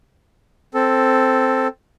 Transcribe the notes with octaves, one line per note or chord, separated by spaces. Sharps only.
C4 A4